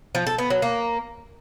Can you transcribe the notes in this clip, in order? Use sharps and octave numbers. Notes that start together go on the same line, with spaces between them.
F3
A4
B3
F#3
A#3